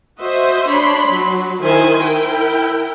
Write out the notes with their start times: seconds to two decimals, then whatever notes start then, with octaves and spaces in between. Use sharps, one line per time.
0.19 F#4 C5 D#5 E5
0.69 D4 C#5 B5 C6
1.10 F#3
1.62 D#3 E4 C5 G#5
2.04 E4 A#4 G5